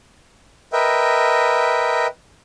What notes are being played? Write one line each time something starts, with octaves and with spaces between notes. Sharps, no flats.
A#4 B4 D#5 E5 G5